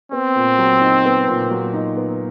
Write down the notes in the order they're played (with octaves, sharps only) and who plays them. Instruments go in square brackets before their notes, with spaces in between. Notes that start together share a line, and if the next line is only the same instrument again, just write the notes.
[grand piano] B3 [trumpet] C4
[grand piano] A#2
F#3
D#4
B3
A#2
F#3
D#4
B3